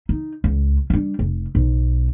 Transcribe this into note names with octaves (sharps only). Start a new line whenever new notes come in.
D#4
C#2
G3 D4
F1
B1